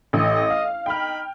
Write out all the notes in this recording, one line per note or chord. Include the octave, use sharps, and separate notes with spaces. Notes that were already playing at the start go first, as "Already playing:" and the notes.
A1 D#5
F5
D#4 G5 B5 F6